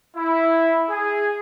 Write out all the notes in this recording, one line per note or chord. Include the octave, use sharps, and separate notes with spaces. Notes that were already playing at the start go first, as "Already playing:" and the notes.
E4
G#4